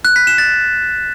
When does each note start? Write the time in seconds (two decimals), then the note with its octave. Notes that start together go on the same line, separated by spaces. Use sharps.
0.05 F#6
0.16 B6
0.27 E7
0.38 A6